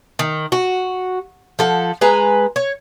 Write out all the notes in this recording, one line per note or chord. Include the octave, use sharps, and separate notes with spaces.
D#3
F#4
F3 A4 F#5
G#3 B4 G#5 A#5
C#5